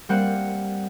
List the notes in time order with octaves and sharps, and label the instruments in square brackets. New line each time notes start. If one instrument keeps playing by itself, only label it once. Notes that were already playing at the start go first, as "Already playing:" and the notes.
[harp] G3 A#3 C4 F#5